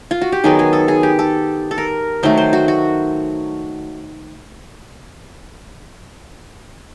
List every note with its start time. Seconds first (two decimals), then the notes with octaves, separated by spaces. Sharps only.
0.11 F4
0.21 F#4
0.32 G4
0.44 D#3 F#3 B3 G#4
0.59 G#4
0.73 A4
0.88 G#4
1.03 G4
1.19 A4
1.71 A4
1.78 A#4
2.23 D#3 F#3 A3 C5
2.37 C5
2.53 F#4
2.68 F#4